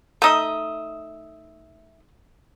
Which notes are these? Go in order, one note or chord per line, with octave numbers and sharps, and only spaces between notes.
A3 D#4 D#5 E5 D#6